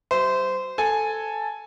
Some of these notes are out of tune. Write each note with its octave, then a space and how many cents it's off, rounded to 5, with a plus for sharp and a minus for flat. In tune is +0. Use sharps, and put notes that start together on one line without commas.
G3 -40 C5 -20 E5 +0
A4 +0 G#5 +0